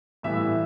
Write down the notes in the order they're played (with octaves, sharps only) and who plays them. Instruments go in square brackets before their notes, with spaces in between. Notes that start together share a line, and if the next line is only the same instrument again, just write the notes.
[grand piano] A2 E3 G3 B3 E5